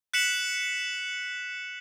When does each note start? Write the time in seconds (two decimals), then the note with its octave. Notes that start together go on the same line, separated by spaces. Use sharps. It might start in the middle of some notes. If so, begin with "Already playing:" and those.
0.14 F#6 B6 C#7 E7 F#7